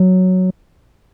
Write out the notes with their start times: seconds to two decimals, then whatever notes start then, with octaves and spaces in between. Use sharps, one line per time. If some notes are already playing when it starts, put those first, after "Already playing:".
Already playing: F#3